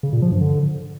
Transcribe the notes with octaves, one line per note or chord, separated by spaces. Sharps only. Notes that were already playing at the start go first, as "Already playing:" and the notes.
C#3
A#2
F3
G2
D3